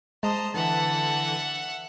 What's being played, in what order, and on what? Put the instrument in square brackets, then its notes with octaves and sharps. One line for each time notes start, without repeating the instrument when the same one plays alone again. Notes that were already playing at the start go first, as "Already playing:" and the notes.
[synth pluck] G#3 [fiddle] C5 [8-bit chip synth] A5 A#5 D#6
[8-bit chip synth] D3 E3 [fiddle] E5 F#5 [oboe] A5